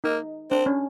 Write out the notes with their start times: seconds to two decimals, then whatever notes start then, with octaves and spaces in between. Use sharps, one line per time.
0.04 A#3 D#4
0.51 C4 D4
0.66 C#4